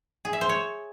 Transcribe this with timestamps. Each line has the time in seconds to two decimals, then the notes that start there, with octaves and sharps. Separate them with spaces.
0.25 G#4
0.33 E5
0.41 C5
0.49 C#5